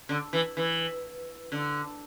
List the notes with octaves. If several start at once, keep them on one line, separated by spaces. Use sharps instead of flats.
D3
E3
E3
D3